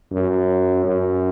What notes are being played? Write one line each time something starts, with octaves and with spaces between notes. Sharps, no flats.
F#2
F#2